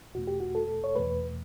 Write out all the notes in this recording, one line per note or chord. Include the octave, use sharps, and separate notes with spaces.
E2 B2 A3 F#4
G4
F#4
A4
C#5
E2 B2 A3 B4